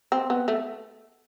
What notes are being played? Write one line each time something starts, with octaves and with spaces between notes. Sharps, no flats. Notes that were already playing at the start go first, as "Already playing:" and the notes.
C4
B3
A3